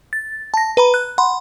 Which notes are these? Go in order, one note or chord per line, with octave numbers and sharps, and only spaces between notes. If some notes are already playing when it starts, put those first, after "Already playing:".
A6
A5 A#6
B4 A#5 B5
F#6
F#5 B5 C6